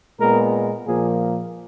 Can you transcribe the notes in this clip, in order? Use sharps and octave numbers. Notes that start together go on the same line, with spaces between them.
A#2 G#3 B3 A#4
A#2 F3 A#3 G#4